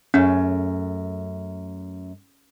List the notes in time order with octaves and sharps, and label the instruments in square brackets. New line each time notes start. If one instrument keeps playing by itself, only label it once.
[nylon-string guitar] F#2 A3 [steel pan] C#4